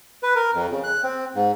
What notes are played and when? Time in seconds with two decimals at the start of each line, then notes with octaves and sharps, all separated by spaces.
0.23 B4
0.36 A#4
0.54 F2
0.71 C#3
0.84 F#6
1.03 C4
1.35 G#2